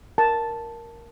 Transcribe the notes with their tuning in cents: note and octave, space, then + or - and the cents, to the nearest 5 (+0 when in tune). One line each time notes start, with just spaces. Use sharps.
A#4 +0 A5 +0